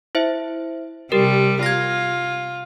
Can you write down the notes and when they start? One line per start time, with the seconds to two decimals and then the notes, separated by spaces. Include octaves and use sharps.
0.15 E4 C5 E5
1.12 C3 G3 G4 A#4
1.63 F4 G#6 A#6